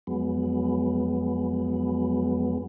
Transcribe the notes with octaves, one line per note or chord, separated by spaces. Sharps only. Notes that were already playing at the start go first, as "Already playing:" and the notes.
F2 F#3 G#3 B3